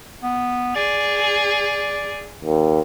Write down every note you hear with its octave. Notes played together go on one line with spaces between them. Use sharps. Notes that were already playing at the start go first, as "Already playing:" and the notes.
B3
G#4 D5
D#2